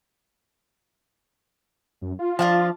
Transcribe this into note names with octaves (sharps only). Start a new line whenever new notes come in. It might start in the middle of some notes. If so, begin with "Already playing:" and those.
F#2
F4
F3 D4 F5 A5